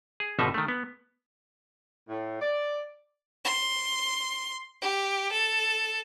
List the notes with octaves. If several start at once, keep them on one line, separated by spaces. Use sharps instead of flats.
G#4
G#1 B2 D3 F3 D#4 E5
D#3 A3
B3
A2
D5
C6
G4
A4